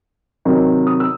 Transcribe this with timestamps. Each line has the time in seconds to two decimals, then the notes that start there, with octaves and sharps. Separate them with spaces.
0.45 C3 D#3 F#3
0.87 D#6
1.00 E6